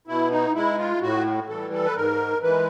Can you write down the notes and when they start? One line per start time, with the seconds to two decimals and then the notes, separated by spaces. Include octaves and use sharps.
0.07 B2 E4
0.31 D#4
0.55 G#3 E4
0.78 F4
1.02 A2 F#4
1.49 E3 G3 A4
1.73 A4
1.86 B4
1.96 G#2 A#4
2.42 E3 G#3 B4